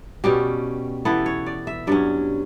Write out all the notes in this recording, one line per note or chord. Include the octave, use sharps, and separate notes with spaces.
B2 G3 C#4 G4
E3 B3 E4 A4
C#5
D5
E5
G2 F#3 C#4 D5